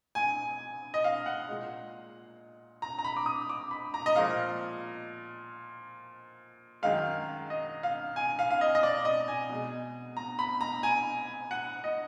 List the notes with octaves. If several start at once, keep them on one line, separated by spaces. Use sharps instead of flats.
G#5
D#5
F5
F#5
A#2 G#3
A#5
A#5
B5
D6
D#6
D6
B5
A#5
D#5
A#2 F3 G#3 F5
F#2 D#3 G#3 F5
D#5
F5
G#5
F5
F5
D#5
D#5
D5
D#5
G#5
B2 G#3
A#5
B5
A#5
G#5
F#5
D#5